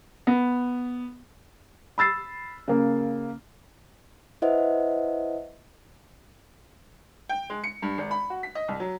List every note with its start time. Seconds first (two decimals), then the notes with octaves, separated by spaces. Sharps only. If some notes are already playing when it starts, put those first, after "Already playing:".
0.27 B3
1.98 B5 E6 A6 C7
2.68 C#3 A#3
4.42 E4 B4 C5 D#5 E5 F#5
7.29 G5
7.50 G#3
7.64 C#7
7.82 G2
7.98 G#1
8.11 B5
8.30 F#4
8.43 B6
8.55 D#5
8.68 C2
8.80 F#3